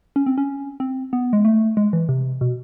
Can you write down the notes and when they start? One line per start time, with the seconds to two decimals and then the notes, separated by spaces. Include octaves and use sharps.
0.16 C#4
0.26 C4
0.38 C#4
0.80 C4
1.13 B3
1.33 G#3
1.45 A3
1.77 G#3
1.93 E3
2.09 C3
2.41 B2